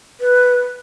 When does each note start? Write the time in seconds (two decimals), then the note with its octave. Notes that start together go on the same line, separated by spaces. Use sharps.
0.20 B4